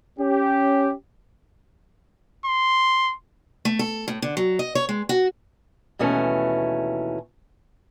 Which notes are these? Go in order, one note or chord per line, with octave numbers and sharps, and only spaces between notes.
C#4 G4
C6
A3
A4
A2
D3
F#3
D#5
C#5
G#3
F#4
D#2 B2 E3 A3 C#4